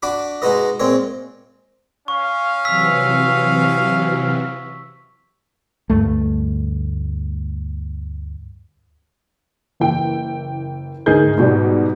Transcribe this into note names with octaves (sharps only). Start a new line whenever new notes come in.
D4 F#4 B5 D6
G#3 D#4 F#4 B4 D#5
A#2 G#3 C4 C#5
C#4 F5 C#6
C3 E3 F#3 E6 B6
D2 G2 A3
F#1 E3 G5
D2 G#2 D#4 G#4 A#4 G6
G#2 B2 G3